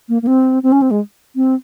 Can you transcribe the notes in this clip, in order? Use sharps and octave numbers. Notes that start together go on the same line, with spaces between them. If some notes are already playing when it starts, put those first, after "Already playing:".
A#3
A#3
C4
C4
C#4
C4
G#3
C4